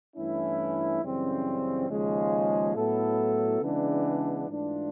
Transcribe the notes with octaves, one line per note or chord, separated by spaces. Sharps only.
G2 E3 A3 C#4 E4
F#2 C#3 E3 G3 C4
D#2 C#3 F3 G#3
A2 F#3 B3 E4 A4
C#3 E3 G#3 B3 D4
G#2 E3 A3 D4 F4